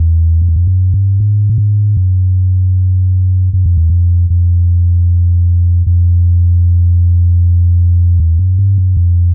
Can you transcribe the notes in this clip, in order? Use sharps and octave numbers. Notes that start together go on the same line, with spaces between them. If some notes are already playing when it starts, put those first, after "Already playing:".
Already playing: E2
F2
E2
F2
F#2
G2
G#2
A2
G#2
F#2
F#2
F2
E2
F2
F2
F2
E2
F#2
G2
F#2
F2